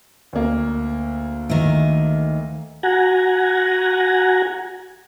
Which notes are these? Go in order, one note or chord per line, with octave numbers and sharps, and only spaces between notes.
D2 A#3
D#3 A3
F#4 F#5 G#5 A#5